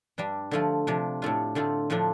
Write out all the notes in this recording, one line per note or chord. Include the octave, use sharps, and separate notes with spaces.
G2 G3 D4
D3 F3 A3 F4
C3 F3 D4
A2 A3 D4 F4
D3 A3 C4 F4
A2 F3 A3 D4